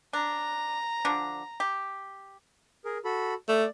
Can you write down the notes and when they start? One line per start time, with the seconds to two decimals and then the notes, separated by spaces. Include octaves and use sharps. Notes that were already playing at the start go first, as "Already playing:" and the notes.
0.13 D4 A#5
1.05 D3 F3 D4
1.60 G4
2.85 G#4 A#4
3.05 F#4 A4 B5
3.49 A3 D5